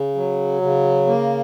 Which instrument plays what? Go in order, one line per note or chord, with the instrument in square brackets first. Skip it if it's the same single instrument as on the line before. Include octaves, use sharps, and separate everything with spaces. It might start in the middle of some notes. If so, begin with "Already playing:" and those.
Already playing: [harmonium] C#3
F#3
C#3
A#3